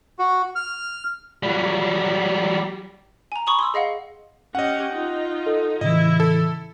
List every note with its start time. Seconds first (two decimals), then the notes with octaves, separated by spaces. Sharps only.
0.19 F#4
0.56 F6
1.43 F#3 G3
3.32 G#5 A#5
3.47 B5 C#6 D#6 F#7
3.59 C6 D#6 E6
3.74 G#4 D#5 F5 F#5
4.55 C#4 G4 D#5 F#5
4.93 D#4 F4
5.47 A4
5.81 A2 C#3 E3 E4 D#5
6.20 A4